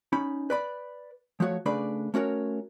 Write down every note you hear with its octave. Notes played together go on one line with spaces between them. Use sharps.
C#4 D#4 B5
B4 D5 B5
F3 A3 F#4 C#5
C#3 A3 D4 B4 D5 B5
A3 C#4 F#4 A#4 C#5